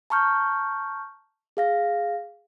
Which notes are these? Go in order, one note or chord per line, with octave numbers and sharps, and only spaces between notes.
A5 A#5 C#6 F6 G6
G#4 F5 A#6